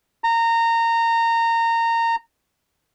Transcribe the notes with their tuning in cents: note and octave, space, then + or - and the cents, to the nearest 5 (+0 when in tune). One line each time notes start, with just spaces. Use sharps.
A#5 -20